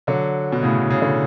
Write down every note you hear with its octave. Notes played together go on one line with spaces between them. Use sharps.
D3 F#3
B2
A2 C#3
C#3
D3